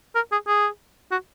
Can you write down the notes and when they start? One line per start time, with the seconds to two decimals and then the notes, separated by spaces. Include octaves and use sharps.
0.15 A#4
0.32 G#4
0.47 G#4
1.11 F#4